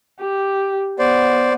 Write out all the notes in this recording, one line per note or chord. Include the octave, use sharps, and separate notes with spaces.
G4
B3 C5 D5